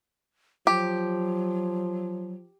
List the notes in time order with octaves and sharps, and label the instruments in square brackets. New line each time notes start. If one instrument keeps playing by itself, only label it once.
[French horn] F3 [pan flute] F#3 [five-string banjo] G4